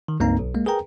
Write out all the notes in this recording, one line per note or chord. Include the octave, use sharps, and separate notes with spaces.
D#3
C#2 G2 A#3 C4 D#4 A#5
B1
G#3 A#3
G#4 A#4 B4 G5 A#5